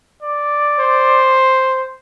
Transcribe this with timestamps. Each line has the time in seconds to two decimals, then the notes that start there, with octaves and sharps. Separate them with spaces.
0.23 D5
0.79 C5